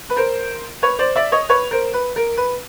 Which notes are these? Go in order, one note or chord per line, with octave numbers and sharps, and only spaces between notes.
B4
A#4 C5
B4 C#5
C5 D5
D5 E5
C#5 D#5
B4 C#5
A#4 C5
B4
A#4
B4